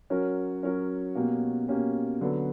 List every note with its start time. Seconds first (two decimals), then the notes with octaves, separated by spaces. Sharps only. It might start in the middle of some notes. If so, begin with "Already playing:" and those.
0.10 F#3 C#4 F#4 A#4 C#5
0.63 F#3 C#4 F#4 A#4 C#5
1.15 B2 A#3 C#4 G4
1.68 B2 A#3 C#4 G4
2.21 D3 F#3 B3